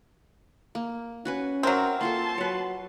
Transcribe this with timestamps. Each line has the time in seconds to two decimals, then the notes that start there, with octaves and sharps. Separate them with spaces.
0.75 A#3
1.25 C#4 F#4 B4 G#5
1.63 F#3 C4 A#4 E5
2.01 A#3 F4 A4 A5 C6
2.38 F#3 B4 C#5